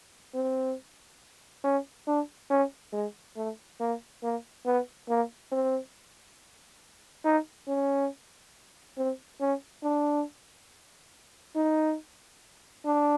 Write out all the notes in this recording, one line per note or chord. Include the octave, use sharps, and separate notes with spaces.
C4
C#4
D4
C#4
G#3
A3
A#3
A#3
B3
A#3
C4
D#4
C#4
C4
C#4
D4
D#4
D4